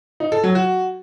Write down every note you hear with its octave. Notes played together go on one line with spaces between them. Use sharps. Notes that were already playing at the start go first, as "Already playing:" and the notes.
D#4
A4
F#3
F#4